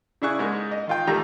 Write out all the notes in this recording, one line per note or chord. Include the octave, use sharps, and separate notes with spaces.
C#3 D4 E4 G#4 C#6 F#6
G#2 G#3 A#3
D#5
D#3 F4 G5
D#2 D#3 G3 A3 G4 A#5